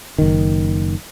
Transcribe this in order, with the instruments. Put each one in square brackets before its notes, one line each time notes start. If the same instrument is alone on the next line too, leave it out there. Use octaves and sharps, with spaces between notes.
[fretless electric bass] F#1 D#3